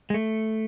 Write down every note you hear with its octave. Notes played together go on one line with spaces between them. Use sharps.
G#3
A3